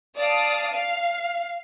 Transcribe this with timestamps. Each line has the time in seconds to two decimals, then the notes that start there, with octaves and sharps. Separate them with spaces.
0.18 D5 F5 A5 D#6
0.73 F5